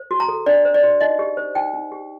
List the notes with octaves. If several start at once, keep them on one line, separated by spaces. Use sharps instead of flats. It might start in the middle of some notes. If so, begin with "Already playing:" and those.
Already playing: C5
F#4
A#5
A4
D4 D5
C5
D5
F#4
D#4 D#5
G4
C5
D#4 G5
D#4
G4